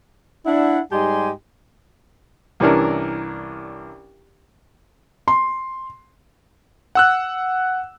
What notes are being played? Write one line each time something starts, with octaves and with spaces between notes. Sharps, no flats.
D4 E4 F#5
G#2 G3 G4 D#5 G#5 C6
C2 E3 C#4 D4 A#4
C6
F#5 E6 F#6